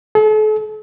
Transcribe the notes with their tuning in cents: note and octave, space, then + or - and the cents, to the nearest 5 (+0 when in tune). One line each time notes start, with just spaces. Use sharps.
A4 -40